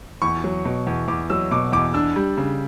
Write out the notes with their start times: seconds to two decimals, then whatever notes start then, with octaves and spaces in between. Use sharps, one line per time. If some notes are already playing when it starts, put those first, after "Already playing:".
0.22 E2 C#6
0.44 F#3
0.65 B2
0.87 E2
1.08 E2 D6
1.30 F#3 E6
1.51 B2 D6
1.72 E2 D6
1.94 D4 E6
2.16 G3
2.38 C#3